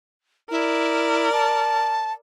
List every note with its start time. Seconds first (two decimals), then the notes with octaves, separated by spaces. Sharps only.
0.51 E4 A#4 D5
1.32 A5